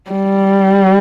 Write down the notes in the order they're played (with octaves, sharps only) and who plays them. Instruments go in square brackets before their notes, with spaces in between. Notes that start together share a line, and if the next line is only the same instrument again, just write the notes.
[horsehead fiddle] G3